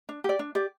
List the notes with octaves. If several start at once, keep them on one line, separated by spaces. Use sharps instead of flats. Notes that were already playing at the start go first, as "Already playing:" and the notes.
D4
G4 D5
D4
G4 D5